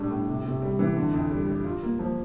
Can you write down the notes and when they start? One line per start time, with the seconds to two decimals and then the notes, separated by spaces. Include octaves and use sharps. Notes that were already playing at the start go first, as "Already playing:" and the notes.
Already playing: A2 G3 D4
0.10 A2
0.28 C3
0.45 C3
0.62 G3
0.79 E3
0.96 D3
1.13 F2
1.31 G3
1.47 G3
1.64 F4
1.82 A#3
1.99 F3